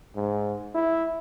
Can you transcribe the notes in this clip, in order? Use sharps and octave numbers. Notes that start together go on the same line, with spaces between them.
G#2
E4